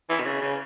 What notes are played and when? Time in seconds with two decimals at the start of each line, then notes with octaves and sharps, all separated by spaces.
0.10 E3
0.19 B2
0.25 C#3
0.41 C#3